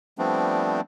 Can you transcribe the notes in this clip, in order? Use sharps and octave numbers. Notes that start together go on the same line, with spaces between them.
F3 G3 A3 B3 C4 D4